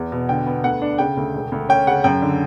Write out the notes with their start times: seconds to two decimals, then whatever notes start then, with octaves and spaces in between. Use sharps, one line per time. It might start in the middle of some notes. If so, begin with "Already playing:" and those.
Already playing: E2
0.12 B2
0.29 D3 G5
0.47 B3
0.64 D2 F#5
0.82 D4
0.98 C#3 G5
1.17 D2
1.34 E1
1.52 D2
1.69 C#4 G5
1.87 C#3 F#5
2.04 F#2 G5
2.22 D3